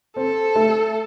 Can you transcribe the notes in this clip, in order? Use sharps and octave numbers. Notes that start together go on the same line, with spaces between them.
C4 A4
A3